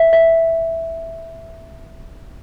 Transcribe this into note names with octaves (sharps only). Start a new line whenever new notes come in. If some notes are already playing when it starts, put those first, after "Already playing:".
Already playing: E5
E5